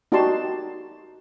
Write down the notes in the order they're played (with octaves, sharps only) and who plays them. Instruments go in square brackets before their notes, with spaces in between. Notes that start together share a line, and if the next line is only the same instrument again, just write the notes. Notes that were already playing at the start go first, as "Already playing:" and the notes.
[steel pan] D#4 F#4 G4 D5 A5 C6